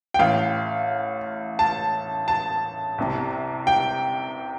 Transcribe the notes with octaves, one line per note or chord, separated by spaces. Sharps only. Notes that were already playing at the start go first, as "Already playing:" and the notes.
G5
A1 A2 F5
A5
A5
C2 C3
G5